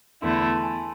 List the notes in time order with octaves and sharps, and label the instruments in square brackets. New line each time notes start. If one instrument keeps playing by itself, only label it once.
[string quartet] E2 D3 A3 E4 [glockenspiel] C6
[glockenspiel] B5
A5
G#5
A5